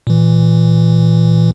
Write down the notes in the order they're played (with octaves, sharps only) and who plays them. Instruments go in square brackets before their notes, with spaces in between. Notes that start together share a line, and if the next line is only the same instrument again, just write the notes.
[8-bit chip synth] A#2 E3